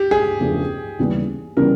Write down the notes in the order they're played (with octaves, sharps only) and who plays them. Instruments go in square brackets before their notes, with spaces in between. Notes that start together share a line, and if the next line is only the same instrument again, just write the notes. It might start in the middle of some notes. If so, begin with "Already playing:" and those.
Already playing: [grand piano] G4
G#4
[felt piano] E2 C#3 F3 A3 D4
D#2 C#3 E3 G3 B3
[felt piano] C#3 E3 G3 B3 [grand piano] A#4